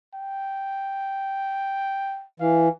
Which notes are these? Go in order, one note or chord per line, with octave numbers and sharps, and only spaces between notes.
G5
E3 F5